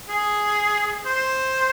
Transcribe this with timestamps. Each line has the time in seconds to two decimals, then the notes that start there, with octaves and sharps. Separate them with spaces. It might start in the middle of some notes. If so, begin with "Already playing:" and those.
0.09 G#4
1.06 C5